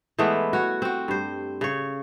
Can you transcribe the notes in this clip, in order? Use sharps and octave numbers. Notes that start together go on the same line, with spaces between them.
E3 G#3 A3 B3
F#4 C#5
C4 F#4
G2 C5
C#3 C#5